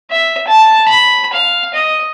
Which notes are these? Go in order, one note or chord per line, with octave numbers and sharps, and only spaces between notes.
E5
A5
B5
F5
D#5